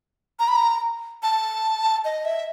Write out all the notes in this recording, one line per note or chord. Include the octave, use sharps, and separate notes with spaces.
A#5
B5
A#5
A5
D#5
E5